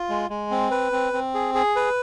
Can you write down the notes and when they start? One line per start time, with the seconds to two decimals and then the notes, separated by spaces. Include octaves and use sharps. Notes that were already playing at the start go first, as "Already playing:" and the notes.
Already playing: F4
0.09 G#3
0.30 G#3
0.51 C4
0.71 B4
0.92 C4
1.13 C4
1.34 G#4
1.55 G#4
1.76 B4